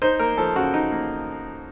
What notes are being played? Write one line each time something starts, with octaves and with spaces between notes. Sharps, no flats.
D#4 C5
A#3 A#4
F3 A4
C#3 F#4
D#4
A#3